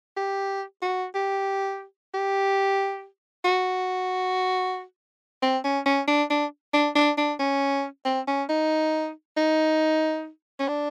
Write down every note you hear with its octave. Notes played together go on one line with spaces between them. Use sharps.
G4
F#4
G4
G4
F#4
C4
C#4
C#4
D4
D4
D4
D4
D4
C#4
C4
C#4
D#4
D#4
C#4
D4